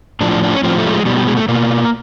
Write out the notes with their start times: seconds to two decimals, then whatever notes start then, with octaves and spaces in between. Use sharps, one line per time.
0.21 A2 F3 D4
0.31 D4
0.43 D4
0.54 C#4
0.63 A2 F3 C4
0.78 A3
0.85 G3
0.92 G#3
1.05 B2 G3
1.17 G3
1.27 G#3
1.37 A3
1.48 B2 A#3